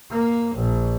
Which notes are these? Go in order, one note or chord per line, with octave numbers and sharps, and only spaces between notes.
A#3
A#1